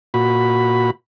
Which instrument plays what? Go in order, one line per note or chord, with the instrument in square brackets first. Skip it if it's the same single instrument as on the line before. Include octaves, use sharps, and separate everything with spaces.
[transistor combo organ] A#2 F#4 B5